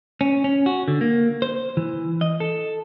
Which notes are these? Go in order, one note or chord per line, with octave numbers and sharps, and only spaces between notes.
C#4
C#4
F#4
D3
A#3
C5
E3
D#5
A4